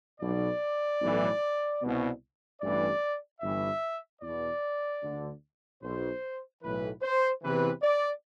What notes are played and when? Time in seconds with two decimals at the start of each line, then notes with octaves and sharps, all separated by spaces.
0.20 B1 B2 D5
1.00 B1 A2 E3
1.81 C2 B2
2.60 A1 G2 E3 D5
3.41 G1 G2 E3 E5
4.21 E2 B2 D5
5.02 D2 D3
5.81 B1 B2 C5
6.61 B1 A2 E3 B4
7.02 C5
7.42 E2 C3 E3 B4
7.82 D5